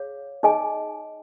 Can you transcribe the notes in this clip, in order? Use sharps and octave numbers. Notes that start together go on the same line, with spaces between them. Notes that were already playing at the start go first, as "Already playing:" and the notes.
Already playing: G#4 C#5 F5
D#4 G#4 D#5 G#5